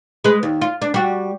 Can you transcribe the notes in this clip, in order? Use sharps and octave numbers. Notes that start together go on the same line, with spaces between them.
G#3 B4
D#2
F4
D4
G3 F#4